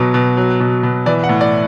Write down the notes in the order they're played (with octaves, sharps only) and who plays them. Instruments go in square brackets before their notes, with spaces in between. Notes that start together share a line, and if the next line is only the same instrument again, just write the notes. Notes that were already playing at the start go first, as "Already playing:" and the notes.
Already playing: [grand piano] B2 F#3
B2
F#3
B2
B2
E3 D5
F#5
A2
D5